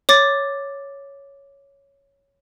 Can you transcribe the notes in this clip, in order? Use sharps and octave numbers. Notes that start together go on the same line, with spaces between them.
C#5 D6 A6